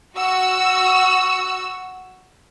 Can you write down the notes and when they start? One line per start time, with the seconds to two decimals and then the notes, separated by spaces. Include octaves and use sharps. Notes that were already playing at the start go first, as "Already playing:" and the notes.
0.14 F#4 E6